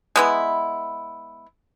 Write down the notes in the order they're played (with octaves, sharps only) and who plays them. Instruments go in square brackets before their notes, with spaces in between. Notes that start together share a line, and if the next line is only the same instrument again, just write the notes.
[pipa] G#3 B3 E4